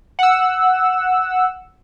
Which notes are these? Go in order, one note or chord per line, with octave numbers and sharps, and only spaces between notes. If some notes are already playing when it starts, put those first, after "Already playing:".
F#5 E6